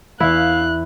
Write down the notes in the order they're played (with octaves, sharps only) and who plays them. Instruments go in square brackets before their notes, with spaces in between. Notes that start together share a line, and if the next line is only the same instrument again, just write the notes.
[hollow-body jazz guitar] E2 E3 [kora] E4 [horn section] E5 F5 [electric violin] F#6